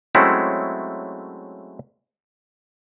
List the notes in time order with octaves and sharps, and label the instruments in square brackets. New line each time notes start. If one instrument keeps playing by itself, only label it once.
[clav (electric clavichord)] F#3 G#3 A3 C4 C#4 E4